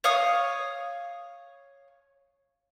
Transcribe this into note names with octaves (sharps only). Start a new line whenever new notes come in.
C#5 F5 D#6